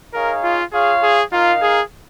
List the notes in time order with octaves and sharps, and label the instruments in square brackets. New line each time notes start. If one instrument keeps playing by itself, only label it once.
[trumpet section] D#4 G#4 C#5 F5 [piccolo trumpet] A#4
[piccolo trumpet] F4
[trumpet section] F4 C#5 F5 [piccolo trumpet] G#4
[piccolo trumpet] G#4
[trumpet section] D#4 A#4 F5 [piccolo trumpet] F4
[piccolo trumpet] G#4